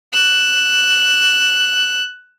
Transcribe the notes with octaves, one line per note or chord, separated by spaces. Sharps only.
F#6 E7